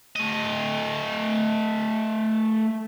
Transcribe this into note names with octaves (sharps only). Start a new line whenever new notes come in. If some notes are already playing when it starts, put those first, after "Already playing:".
A3 D#5